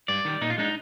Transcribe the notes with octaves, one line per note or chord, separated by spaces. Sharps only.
G2 D5
D#3 G3
A#2 D#4
F4
G#3 D4 D#4